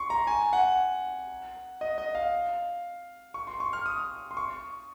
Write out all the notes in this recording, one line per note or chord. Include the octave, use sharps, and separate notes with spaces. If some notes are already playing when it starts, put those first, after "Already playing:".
Already playing: C6 C#6
A#5
G#5
F#5
D#5
D#5
F5
C#6
C6
C#6
F6
D#6
C6
C#6